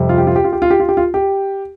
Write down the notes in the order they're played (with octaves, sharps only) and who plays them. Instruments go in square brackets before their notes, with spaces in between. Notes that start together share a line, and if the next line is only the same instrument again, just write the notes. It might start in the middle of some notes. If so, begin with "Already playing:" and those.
Already playing: [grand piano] F2 C3 G3
F4
G4
F4
G4
F4
G4
F4
G4
F4
G4
F4
G4